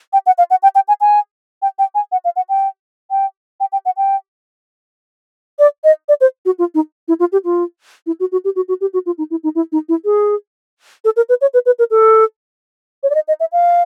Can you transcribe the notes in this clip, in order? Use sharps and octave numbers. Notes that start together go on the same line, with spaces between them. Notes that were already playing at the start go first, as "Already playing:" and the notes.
G5
F#5
F5
F#5
G5
G5
G#5
G#5
G5
G5
G#5
F#5
F5
F#5
G5
G5
G5
G5
F#5
G5
D5
D#5
D5
C5
F#4
F4
D#4
E4
F4
G4
F4
E4
F#4
F#4
G4
F#4
F#4
G4
F#4
F4
D#4
E4
D#4
E4
D#4
E4
G#4
A4
A#4
B4
C#5
B4
B4
A#4
A4
C#5
D5
D#5
D#5
E5
F5